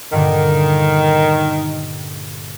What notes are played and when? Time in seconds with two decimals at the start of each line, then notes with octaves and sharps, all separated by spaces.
0.13 G2 A#2 D3 D#3